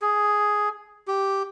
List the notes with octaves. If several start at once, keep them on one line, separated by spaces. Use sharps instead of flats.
G#4
G4